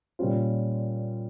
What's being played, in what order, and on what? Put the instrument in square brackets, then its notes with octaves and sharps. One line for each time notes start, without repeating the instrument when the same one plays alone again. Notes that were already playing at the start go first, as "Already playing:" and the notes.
[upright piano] A#2 G3 C#4 F4